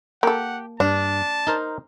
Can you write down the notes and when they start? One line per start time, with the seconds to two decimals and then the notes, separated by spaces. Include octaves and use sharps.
0.23 A#3 G4 A4 F#5
0.80 G2 D4 A5
1.47 D#4 A#4 C5